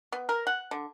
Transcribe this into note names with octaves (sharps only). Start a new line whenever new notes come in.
B3
A#4
F#5
D3